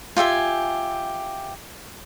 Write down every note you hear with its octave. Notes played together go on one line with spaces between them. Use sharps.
F4 G4 E5 G#5